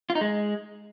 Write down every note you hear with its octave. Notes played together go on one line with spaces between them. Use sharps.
F4
D#4
G#3